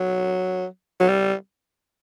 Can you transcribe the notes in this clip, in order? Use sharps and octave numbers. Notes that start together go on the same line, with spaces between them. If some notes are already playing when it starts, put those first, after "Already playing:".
Already playing: F#3
F#3
G3